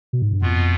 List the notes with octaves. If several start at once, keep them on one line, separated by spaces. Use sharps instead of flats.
B2
G#2
G2
F2 B2 B3 F4